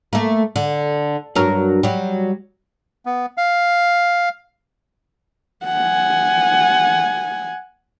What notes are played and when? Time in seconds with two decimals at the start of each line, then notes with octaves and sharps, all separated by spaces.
0.13 A3 A#3
0.56 D3
1.35 G2 F#3 A#4
1.83 F#3 G3
3.06 B3
3.37 F5
5.65 F#5 G#5